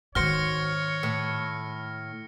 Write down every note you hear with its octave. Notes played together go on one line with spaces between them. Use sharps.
G#2 D#3 F#4 C5 C#5 F6 A#6 C#7
A2